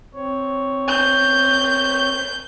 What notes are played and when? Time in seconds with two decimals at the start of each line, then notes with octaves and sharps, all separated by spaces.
0.15 C4 C#5
0.88 G6